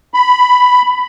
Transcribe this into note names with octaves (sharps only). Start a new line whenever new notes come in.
B5